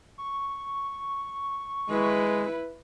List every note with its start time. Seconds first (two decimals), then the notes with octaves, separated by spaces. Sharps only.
0.18 C#6
1.90 G#3 E4 B4